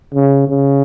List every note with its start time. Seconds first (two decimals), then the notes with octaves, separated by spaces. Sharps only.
0.14 C#3
0.48 C#3